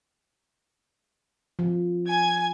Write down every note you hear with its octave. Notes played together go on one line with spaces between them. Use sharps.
F3
G#5 G#6